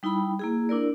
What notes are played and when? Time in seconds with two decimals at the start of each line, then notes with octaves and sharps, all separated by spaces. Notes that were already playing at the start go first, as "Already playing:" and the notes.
0.03 G3 D#4 E4 G5 B5
0.39 A#3 E4 G#4
0.69 D4 E4 A#4 D5